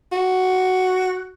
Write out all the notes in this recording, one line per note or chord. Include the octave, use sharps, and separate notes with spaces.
F#4